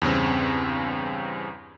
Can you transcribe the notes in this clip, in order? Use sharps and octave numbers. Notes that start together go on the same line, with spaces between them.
E2 G2 C#3 C4